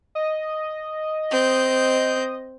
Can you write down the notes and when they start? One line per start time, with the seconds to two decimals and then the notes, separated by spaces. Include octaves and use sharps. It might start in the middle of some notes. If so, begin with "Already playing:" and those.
0.15 D#5
1.31 C4 G6